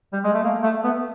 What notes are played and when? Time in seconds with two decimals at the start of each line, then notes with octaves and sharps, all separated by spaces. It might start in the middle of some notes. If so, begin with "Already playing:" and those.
0.13 G3
0.24 G#3
0.34 A3
0.43 A#3
0.63 A3
0.84 B3